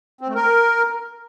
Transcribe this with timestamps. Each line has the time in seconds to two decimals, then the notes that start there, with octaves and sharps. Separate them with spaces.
0.21 C4
0.28 A3
0.35 A#4